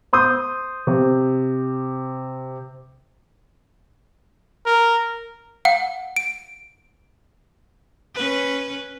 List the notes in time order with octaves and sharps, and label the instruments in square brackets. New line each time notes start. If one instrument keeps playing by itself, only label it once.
[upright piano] C5 C6 D#6 G6
C3
[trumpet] A#4
[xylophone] F5 F#5
D7
[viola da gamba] C#4 B4